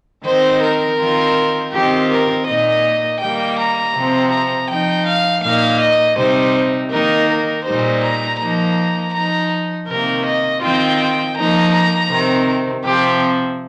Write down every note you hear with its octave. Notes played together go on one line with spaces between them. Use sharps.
D#3 C4 D#4 C5
A#4
D#3 C4 F4
D#3 C4 F4 G4
A#4
A#2 A#3 D#4 D#5
D#3 G3 A#3 G5
A#5
C3 F3 C4
A#5
F3 D#4 G5
F5
A#2 A#3 D#4 F5
D#5
C3 G3 D#4 C5
D#3 A#3 D#4 A#4
A#4
A#2 G3 D#4 C5
A#5
F3 A#3 D#4 A#5
F3 D#4 A#5
C3 D#3 A#3 A#4
D#5
D#3 C4 F4 G5
F3 A#3 D#4 A#5
A#5
C3 D#3 C4
C3 F3 C4 G4